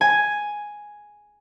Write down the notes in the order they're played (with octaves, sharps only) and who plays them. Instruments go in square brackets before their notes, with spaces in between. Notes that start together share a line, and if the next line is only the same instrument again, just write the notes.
[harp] G#5